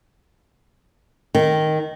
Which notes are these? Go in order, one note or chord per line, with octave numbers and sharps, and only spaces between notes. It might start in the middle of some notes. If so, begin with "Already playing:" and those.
D#3